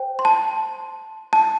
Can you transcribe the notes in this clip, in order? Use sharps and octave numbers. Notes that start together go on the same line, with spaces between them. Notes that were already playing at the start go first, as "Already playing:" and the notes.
Already playing: C5 G5
C6
A5
A5